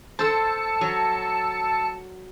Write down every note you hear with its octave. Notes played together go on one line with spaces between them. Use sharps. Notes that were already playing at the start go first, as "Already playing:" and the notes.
A4 C5 A5 E6 C#7
F#3